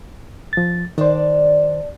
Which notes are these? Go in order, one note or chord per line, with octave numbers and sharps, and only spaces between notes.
F3 A6
D#3 D4 C5 D5